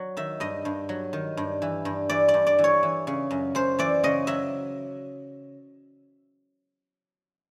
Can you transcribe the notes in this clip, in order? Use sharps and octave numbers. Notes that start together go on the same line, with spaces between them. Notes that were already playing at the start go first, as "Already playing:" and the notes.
Already playing: F#3
D#3 E5
G2 D#5
G2
F#3
D#3
G2
E3
G2
E3 D5
D5
G2
D5
E3
C#5
E3
C#3
F#2
F#2 C5
E3 D5
C#3 D#5
F#3 E5